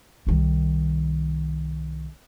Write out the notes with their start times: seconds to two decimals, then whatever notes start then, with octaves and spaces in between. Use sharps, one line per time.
0.27 C2 D#3